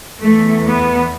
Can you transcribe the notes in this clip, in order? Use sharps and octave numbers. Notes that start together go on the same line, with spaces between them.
E2 E3 A3
B3